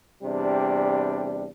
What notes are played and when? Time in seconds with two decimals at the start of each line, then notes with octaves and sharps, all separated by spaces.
0.22 E2 C3 G3 D4